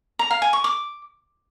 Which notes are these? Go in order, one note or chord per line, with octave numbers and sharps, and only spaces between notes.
A#5
F5
G#5
C#6
D6